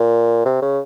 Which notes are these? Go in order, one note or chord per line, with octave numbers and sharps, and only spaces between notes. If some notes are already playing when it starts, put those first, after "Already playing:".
Already playing: A#2
C3
C#3